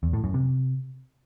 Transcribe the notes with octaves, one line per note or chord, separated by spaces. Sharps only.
E2
A2
F#2
C3